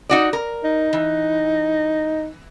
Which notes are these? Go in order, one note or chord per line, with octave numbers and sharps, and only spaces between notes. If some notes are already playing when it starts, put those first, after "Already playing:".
D#4 F#4 D5
A#4
D#4
E3